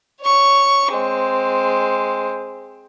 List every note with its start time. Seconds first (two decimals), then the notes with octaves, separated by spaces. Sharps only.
0.21 C#5 C#6
0.92 G#3 C4